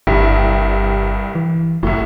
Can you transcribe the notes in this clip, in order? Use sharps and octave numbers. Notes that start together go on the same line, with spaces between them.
G1 C2 G2 G4
E3
F#1 C2 A2